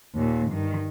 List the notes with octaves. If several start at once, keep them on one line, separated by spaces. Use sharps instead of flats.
D#2 A#2
G2 D#3